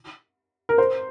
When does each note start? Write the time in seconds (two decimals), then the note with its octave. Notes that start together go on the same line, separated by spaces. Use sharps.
0.69 A#4
0.78 C5